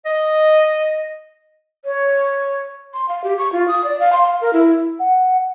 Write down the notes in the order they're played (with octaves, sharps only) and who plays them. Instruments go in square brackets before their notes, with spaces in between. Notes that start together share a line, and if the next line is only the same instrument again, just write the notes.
[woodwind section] D#5
[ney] C#5
[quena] C6
F5
G4
C#6
F4
D#6
D5
F5
C6
F5
A#4
E4
[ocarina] F#5